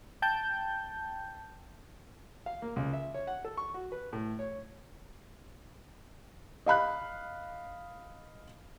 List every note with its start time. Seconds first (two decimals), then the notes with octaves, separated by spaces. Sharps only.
0.22 G5 A5 G6
2.46 F5
2.62 A#3
2.76 C#2
2.93 E5
3.14 C#5
3.27 F#5
3.45 A4
3.57 C#6
3.74 F#4
3.92 B4
4.13 A2
4.39 C#5
6.66 D#5 F5 B5 F#6